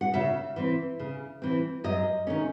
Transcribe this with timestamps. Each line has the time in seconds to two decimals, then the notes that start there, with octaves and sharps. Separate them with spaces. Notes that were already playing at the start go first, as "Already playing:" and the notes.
0.01 F#5
0.14 C#3 E5
0.56 E3 C4
0.99 C#3
1.42 E3 C4
1.84 F#2 D#5
2.27 D#3 A3 C#4